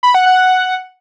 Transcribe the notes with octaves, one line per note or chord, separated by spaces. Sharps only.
B5
F#5
F#5